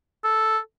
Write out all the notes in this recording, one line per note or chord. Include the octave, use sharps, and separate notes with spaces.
A4